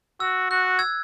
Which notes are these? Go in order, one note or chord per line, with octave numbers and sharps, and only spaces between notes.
F#4 E6
F#4 F#6
E6 G#6